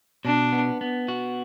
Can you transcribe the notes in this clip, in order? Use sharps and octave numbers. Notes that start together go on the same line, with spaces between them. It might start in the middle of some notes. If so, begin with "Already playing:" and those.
B2 D4
B3
B3
F#4